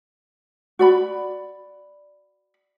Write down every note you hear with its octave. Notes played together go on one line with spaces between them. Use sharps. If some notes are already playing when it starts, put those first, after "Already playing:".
F#4 D5 B5